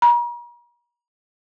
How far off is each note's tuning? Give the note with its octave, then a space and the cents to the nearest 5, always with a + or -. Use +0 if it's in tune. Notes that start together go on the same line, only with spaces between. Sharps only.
A#5 +45